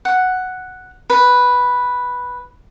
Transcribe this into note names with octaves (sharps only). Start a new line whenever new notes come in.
F#5
B4